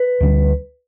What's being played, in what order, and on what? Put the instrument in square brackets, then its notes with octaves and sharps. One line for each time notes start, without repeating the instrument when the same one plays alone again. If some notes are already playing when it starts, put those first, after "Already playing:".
Already playing: [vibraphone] B4
[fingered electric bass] D2 D3 G3